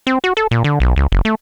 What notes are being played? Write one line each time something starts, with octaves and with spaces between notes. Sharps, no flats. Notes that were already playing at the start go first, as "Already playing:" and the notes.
C4
F#4
A4
A#2
D3
B1
C#2
F#1
A3